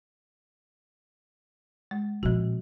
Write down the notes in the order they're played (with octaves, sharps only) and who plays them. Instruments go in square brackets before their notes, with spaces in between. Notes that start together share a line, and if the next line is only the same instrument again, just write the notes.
[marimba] G#3
[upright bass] A#2 C4 [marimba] F3 F#4